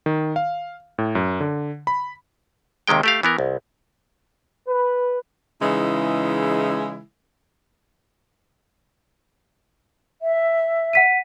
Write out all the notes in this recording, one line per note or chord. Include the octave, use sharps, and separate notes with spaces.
D#3
F5
A2
F#2
D3
B5
D#2 C3 D#3 G#3 G5
A3 G4 F5
E3 B3 A#4
C2
B4
C#3 E3 G#3 D#4 E4
E5
F#5 B6 D#7